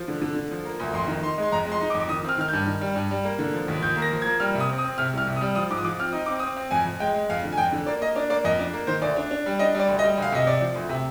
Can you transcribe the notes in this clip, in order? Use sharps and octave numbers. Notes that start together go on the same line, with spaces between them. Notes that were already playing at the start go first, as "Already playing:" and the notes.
Already playing: F3
D3
D3
D3
F3
A#3
D2
F2 C6
D#3
D#4 C6
G#3 C6
F2 A#5
G#3
C6
D#4
D6
F2
D6
D#3 D#6
C4 F6
D#3 F6
G2 G6
D#3
G3
G2
G3
A#3
D3
F3
D#2
D#2 G6
A#3
A#6
F3
G#6
A#3
G3 F6
C3
D#6
C4
D#6
C4
C3 F6
C2 F6
C3
D#6
G3
F3 D#6
G#2 D6
D#6
F3 D6
C4 F6
D#4 D#6
C4 D6
C4 D#6
C4
F2 G#5
F2
G#3 G5
G#3
F2 F5
D3
G#5
F2 G5
D3
A#3 D5
A#3 D#5
D4 D5
A#3 D5
F2 D#5
D4 D5
A#3
D#3 C5
D2 D5
D4
D4
G3
D4 D#5
G3 D5
D2
D#5
G3
D2 F5
C3 D#5
C3 D5
F3
D2
C3